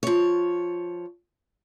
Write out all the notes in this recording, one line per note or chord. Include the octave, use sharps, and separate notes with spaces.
F3 C#5